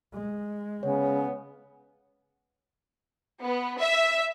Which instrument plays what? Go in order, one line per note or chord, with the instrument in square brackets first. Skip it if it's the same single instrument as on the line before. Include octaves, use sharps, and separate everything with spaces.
[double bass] G#3
[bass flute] C#3 [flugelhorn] B3 [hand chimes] C#5
[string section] B3
E5